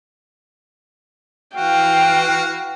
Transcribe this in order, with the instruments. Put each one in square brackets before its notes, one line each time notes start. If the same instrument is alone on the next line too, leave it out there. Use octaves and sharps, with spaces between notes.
[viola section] E3 F5 [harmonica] F#4 [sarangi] G5